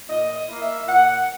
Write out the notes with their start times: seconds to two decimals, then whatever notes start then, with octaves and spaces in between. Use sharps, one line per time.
0.09 A#2 D#5
0.35 D#5
0.48 A#3 E4
0.61 E5
0.87 A#2 F#5